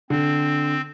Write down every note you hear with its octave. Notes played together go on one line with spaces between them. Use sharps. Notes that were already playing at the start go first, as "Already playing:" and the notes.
D3 C4